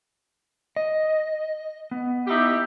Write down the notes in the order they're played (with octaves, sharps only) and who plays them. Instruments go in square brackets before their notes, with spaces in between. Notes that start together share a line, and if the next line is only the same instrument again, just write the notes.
[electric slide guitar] D#5
B3
[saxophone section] D#4 E4 G4